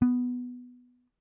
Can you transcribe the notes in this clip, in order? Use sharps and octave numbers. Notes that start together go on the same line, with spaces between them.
B3